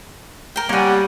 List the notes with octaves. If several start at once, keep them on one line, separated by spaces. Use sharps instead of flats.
A#4 G5
G3 A#3 C#5 F#5 G#5